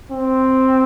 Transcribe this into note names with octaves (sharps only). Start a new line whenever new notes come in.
C4